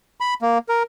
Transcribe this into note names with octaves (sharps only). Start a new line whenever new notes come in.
B5
A#3
A#4